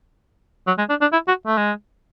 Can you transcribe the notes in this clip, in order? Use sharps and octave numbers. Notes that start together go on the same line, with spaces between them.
F#3
G#3
D4
D4
E4
F#4
A3
G#3